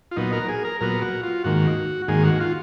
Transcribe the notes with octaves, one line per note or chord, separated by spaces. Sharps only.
F4
A#2 F#3 B3 D#4
A#4
G#4
A#4
A#2 F#3 B3 A#4
F#4
F4
G#2 D#3 A#3 F#4
G#2 D#3 A#3 G#4
F#4
F4